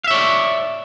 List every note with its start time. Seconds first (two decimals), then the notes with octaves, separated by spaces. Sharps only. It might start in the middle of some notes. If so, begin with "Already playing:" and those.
0.04 F5
0.08 E5
0.11 C#5
0.14 D5